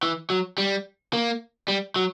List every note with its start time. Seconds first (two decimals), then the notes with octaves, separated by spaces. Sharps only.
0.03 E3
0.30 F#3
0.58 G3
1.13 A#3
1.68 G3
1.96 F#3